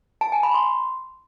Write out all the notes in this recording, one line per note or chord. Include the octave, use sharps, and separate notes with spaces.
A5
G#5
B5
C6